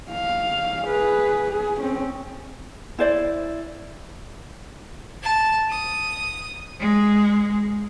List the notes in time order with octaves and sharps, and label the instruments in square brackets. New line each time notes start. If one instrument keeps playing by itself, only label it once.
[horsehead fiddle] F5
G#4 B4
G#4
C4 C#4
[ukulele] E4 C5 D5
[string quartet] A5
D#6
G#3